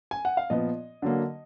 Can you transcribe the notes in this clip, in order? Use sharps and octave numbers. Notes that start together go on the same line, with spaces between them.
G#5
F#5
F5
A#2 F3 B3 D#5
D3 F#3 A#3